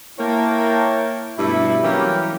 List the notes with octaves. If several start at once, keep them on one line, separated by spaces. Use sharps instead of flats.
A#3 E4 A#4 C#5 G5 A5
G2 B2 A3 E4
E3 F#3 A#3 C#4 G4 A#4